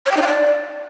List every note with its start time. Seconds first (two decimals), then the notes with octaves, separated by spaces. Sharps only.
0.06 C#5
0.11 G5
0.17 D#4
0.22 F5
0.27 D5